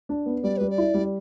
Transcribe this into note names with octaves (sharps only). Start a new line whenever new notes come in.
D4
B3
G3 D5
G3 B4
D5
E4
G3